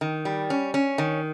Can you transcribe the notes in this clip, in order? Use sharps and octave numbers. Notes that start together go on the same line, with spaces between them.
D#3
G3
C#4
C#4
D#3